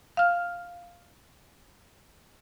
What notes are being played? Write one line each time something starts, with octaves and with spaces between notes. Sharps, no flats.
F5 F6